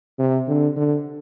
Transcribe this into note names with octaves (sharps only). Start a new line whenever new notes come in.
C3
D3
D3